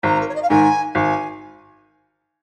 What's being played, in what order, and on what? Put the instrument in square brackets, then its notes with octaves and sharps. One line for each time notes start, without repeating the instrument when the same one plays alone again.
[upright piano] G#1 [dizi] A#5
[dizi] A#4
C#5
D#5
F5
[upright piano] G#2 D#3 [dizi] G#5
[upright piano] G#1 [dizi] G#5